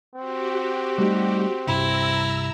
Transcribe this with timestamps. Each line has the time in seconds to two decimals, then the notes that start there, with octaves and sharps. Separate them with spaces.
0.15 C4 F#4 G4
0.98 G3 A3 D#4
1.67 C2 G2 E4 A#5 E6